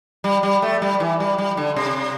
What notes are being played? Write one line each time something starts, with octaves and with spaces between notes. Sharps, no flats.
G3
G3
A3
G3
E3
G3
G3
D3
C3